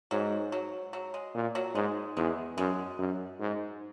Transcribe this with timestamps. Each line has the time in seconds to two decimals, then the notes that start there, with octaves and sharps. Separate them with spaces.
0.11 G#2 F#3
0.52 F#3
0.93 F#3
1.14 G#3
1.35 A#2
1.55 F#3
1.75 G#2 G#3
2.17 E2 G#3
2.57 F#2 G#3
2.99 F#2
3.40 G#2